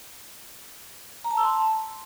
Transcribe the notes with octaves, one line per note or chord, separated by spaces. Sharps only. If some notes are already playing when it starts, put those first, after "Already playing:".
A#5
A5
E6
C6
A5